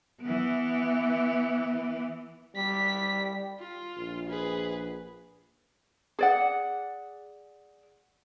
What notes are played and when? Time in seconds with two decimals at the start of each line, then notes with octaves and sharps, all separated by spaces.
0.22 E3 B3
2.56 G3 B6
3.60 F4
3.97 A#1
4.29 G#4 B4
6.19 G#4 D5 F#5